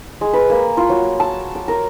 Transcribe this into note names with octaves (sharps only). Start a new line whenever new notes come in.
G#3
B4
A#3
F4
F#3
A5
D6
A#4